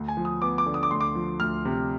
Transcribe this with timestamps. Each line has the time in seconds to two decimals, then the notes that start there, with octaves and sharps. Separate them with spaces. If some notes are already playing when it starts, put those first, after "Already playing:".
Already playing: D2
0.08 G#5
0.17 F3
0.25 D#6
0.42 B3 D6
0.58 D6
0.66 D3
0.74 D#6
0.83 D6
0.91 D2 C6
1.01 D6
1.15 F3
1.40 D2 F6
1.65 C3